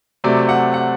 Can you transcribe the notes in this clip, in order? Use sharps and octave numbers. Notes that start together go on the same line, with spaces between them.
C3 F#3 A3 D5
F#5
F#5